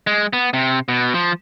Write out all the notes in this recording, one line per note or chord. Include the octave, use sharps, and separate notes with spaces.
G#3
B3
C3
B2
F3